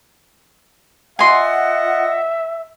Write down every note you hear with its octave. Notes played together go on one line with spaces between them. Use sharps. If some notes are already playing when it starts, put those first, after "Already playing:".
F4 D#5 E5 F#5 G#5 C6